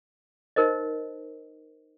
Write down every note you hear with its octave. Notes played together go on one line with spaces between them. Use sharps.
D#4 A#4 C5 D#5